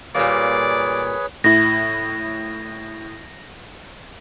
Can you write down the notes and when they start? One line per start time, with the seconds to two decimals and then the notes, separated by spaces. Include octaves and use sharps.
0.15 A#2 G3 A#3 G#4 B4 C#5 D5
1.44 A2 E4 A#6